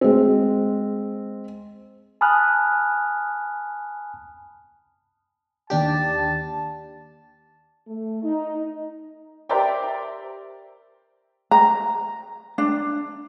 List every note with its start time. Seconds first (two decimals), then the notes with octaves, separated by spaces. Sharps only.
0.01 G#3 C4
2.21 G#5 A5 B5 D#6 F6 F#6
5.70 D#2 D4 G4 A5
7.88 A3
8.23 D#4
9.49 G4 A#4 C5 D5 E5 G5
11.51 A#5
12.58 D4